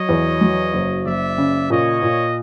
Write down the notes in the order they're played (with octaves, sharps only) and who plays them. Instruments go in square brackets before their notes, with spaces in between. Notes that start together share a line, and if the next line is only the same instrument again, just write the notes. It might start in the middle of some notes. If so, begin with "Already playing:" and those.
Already playing: [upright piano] F#3 [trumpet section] C#5 D#5
[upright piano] E2
F#3
F#1
[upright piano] F#1 [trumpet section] D5 E5
[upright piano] C#3
[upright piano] A#2 [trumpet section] C#5 D#5
[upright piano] A#2